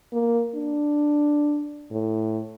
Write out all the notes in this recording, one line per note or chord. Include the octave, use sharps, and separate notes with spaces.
A#3
D4
A2